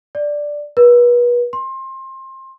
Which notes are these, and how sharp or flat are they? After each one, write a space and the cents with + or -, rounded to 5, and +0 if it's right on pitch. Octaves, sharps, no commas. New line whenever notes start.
D5 +0
B4 -35
C6 +25